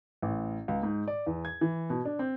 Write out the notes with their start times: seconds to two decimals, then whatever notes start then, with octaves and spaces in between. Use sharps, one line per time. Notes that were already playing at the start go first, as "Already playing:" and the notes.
0.22 A1
0.68 C#2
0.83 G#2
1.07 D5
1.27 E2
1.45 G#6
1.61 E3
1.90 B2
2.05 D4
2.19 C4